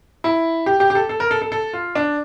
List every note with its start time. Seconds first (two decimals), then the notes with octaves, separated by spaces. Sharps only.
0.24 E4
0.66 G4
0.80 G4
0.90 G4
0.95 A4
1.09 A4
1.20 A#4
1.31 A4
1.42 A4
1.52 A4
1.74 F4
1.95 D4